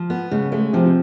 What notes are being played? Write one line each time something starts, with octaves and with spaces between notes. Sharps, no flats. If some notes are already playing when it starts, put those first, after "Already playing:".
Already playing: F3
B3
C#3 G#3
G#3 A3
C3 F3 C4
C4